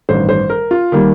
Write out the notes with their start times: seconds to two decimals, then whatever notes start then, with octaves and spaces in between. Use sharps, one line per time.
0.09 A1 G2 D#3 C5
0.29 C5
0.50 A#4
0.71 F4
0.92 D#3 G3 A#3